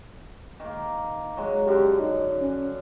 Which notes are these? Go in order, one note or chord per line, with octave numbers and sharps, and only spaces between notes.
D#3 A#3
F#3 G#3
F#2 D3 G4
D#4
C#4